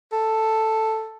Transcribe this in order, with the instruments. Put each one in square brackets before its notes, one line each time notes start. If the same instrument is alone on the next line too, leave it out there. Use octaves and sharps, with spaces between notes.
[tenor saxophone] A4